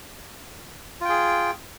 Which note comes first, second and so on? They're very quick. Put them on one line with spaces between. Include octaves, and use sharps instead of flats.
F4 G5 G#4